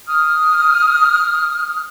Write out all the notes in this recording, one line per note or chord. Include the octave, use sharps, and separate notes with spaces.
D#6 F6